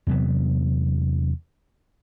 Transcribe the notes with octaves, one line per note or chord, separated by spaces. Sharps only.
E2 C3 F#3 B3